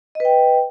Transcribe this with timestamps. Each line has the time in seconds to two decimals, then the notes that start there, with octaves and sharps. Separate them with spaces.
0.15 D#5
0.20 B4
0.25 G5